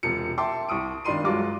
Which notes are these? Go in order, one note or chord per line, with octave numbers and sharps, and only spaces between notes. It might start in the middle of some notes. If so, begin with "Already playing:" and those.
E1 C3 F3 C#7
E5 G5 A5 C6 D6 E6
C2 C#6 D#6 D7
G#1 D#3 D4 B5 C6 D#7
G2 F#3 G#3 F4 D6